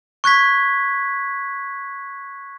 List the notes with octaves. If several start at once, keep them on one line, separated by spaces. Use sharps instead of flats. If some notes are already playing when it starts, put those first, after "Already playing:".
C#6 F#6 G#6 B6